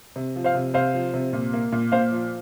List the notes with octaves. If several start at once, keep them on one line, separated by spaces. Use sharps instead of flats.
C3
F3
C5 F5
C3
C3 C5 F5
F3
C3
A#2
A#3
A#2
A#2 C5 F5
F3